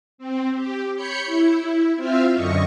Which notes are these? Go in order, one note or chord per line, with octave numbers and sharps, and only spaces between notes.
C4
G4
C#5 B5 G6 C#7
E4
C4 F4 E5 F5
F#2 D3 D#5 C#6